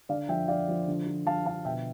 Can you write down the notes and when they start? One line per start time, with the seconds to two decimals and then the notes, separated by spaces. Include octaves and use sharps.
0.09 D3 D5 F5
0.29 F3 E5 G5
0.48 F3 D5 F5
0.68 F3
0.88 D3
1.06 F3
1.26 F3 F5 A5
1.46 D3 F5 A5
1.65 B2 E5 G5